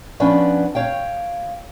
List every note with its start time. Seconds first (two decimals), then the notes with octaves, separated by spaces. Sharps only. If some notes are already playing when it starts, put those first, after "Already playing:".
0.20 F3 B3 C#4 D4 B4
0.75 C#5 F5 G5